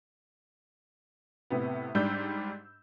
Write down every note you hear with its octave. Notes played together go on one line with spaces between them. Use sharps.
A2 C3 B3
G#2 G3 D4 E6 G6